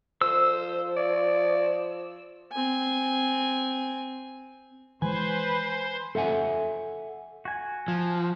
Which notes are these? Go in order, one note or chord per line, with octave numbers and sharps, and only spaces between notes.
F3 C5 E6
D5
C4 G#5
E3 G#3 B4 C5 G#5
A4 E5 F#5 G#5
F#4 G#5
F3